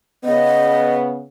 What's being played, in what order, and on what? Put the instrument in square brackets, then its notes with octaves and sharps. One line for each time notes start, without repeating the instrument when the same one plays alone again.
[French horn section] C#3 B3 [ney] D#5